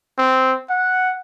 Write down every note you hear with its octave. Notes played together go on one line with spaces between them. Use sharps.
C4
F#5